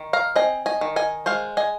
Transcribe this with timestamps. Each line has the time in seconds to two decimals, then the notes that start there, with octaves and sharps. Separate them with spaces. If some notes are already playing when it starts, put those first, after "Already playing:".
Already playing: D#3
0.13 F5 A#5
0.36 C4 D#5 G#5
0.66 D#5 G#5
0.81 D#3
0.96 D#5 G#5
1.26 G#3 C5 F5
1.57 D#5 G#5